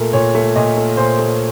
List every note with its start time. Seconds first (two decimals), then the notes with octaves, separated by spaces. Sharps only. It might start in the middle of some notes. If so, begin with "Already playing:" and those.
Already playing: A#2 A3 A#4
0.13 A#2 C#5
0.35 A3
0.56 A#2 D#5
0.77 A3
0.97 A#2 C5
1.19 A3